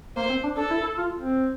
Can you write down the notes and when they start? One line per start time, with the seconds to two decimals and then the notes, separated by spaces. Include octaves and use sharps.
0.16 A#3 C5
0.29 C4
0.43 D4
0.57 D4 A4
0.70 E4
0.83 A4
0.98 F4
1.18 C4